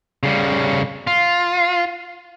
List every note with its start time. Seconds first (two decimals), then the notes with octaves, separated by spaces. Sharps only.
0.23 C#3 G3
1.07 F4